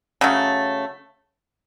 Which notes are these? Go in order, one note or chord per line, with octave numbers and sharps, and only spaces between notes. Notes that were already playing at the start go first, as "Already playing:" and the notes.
C#3 F#3 A3